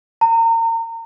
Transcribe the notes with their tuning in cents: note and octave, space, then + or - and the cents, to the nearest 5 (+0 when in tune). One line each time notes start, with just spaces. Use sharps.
A#5 -35